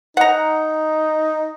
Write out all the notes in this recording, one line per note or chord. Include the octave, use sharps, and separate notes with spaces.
D#4 F#5 A#5